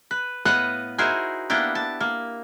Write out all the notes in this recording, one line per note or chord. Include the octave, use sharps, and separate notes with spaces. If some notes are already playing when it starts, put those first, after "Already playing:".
B4
A2 B3 B4 D#5 F5 F#5
D#4 E4 F#4 G#4 A#4 C5
A#3 B3 D4 E4 G4
A5
A#3